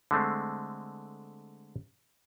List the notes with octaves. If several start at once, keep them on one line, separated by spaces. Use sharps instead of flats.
D3 G#3 A3 C4